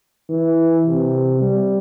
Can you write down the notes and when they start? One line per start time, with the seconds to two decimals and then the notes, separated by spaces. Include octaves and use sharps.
0.30 E3
0.86 C3
1.41 G3